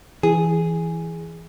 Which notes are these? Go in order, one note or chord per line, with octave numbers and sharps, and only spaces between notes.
E3 G#4